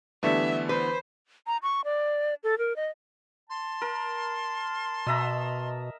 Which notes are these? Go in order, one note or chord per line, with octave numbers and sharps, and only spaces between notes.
D3 E3 G3 A3 B3 D4 E5
B4 C5
A#5
C#6
D5
A4
A#4
D#5
A5 C6
A#4
B2 D#5 E5 A#5